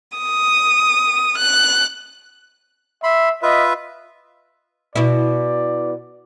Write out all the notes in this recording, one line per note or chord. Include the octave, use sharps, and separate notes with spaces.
D#6
F#6
E5 B5 C6
F4 B4 D#5 E5
B2 E4 D5